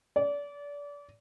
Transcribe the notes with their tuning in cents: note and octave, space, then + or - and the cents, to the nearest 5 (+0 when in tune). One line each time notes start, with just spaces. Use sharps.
D5 -30